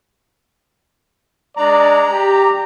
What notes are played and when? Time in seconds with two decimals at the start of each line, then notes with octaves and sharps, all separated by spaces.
1.57 G#3 D4 D5 A#5
2.11 G4